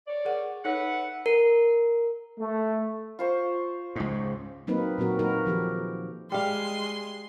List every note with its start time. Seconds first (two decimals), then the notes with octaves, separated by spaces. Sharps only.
0.07 C#5 D5
0.25 G#4 A#4 F#5
0.65 D#4 A4 B4 C#5 E5 F#5
1.26 A#4
2.39 A3
3.19 F4 C5 C#6
3.96 C#2 G#2
4.67 F#3 A#3 C4 D#4 A#4 B4
4.98 A#2 F#3 C4 F#4 A#4
5.19 F#3 A#3 D#4 F#4 A#4 B4
5.46 D#3 F3 G4 A4
6.32 G3 G#3 F5 C6